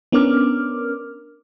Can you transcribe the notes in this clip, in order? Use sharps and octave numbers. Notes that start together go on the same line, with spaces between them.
B3 C#4 D4 A#4 D6 F6